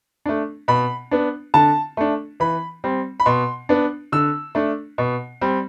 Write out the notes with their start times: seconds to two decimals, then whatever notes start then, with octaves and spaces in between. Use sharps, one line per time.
0.26 A3 D4
0.68 B2 B5
1.11 B3 D4
1.54 D3 A5
1.97 A3 D4
2.40 E3 B5
2.84 G3 C4
3.20 B5
3.26 B2 C6
3.69 B3 D4
4.12 D3 E6
4.55 A3 D4
4.98 B2
5.41 G3 C4